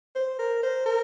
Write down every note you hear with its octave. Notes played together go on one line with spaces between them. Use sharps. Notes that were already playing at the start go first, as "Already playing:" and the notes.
C5
A#4
C5
A#4